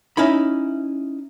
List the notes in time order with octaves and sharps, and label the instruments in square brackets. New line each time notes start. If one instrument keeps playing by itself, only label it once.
[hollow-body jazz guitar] C#4 D#4 E4 B5